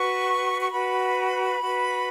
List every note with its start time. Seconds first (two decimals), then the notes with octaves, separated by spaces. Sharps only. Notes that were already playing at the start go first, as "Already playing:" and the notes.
Already playing: F#4 B4 C#6
0.60 C#6
0.71 F#4 B4 B5
1.60 F#4 B4